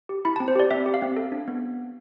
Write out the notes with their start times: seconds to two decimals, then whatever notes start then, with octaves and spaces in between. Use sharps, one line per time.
0.09 G4
0.25 E4 B5
0.36 C4 A5
0.48 C5
0.56 G4 D5
0.71 C4 E5
0.86 G4
0.94 F5
1.02 C4
1.17 A4
1.32 D4
1.48 B3